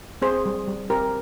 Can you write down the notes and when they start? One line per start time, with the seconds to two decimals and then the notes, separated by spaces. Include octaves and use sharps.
0.22 C4 G#4 C5
0.46 G3
0.68 G3
0.90 C4 G4 A#4